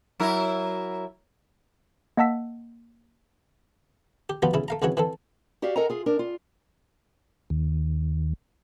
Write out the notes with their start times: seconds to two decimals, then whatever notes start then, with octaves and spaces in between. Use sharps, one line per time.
0.20 F#3 E4 A#4
2.17 A#3 D#5 F#5 A5 E6 B6
4.30 G4
4.42 F3 G3 B3 F4 F#4
4.54 B1 C#3 E4
4.68 A3 F5 A#5
4.82 C2 C#3 E3 F#4 C#5
4.97 E3 C4 A4
5.62 F#4 G4 D5 E5 F5
5.76 A4 A#4 D#5 F#5 G#5 A#5
5.90 F4 G#4
6.06 D4 A#4
6.19 F4
7.50 D#2